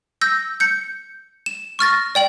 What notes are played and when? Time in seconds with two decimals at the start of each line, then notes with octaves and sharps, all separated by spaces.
0.21 E6 G6 A#6
0.60 G6 C#7
1.46 E7
1.79 C#6 F6 A6 A#6
2.15 D5 G5 F#7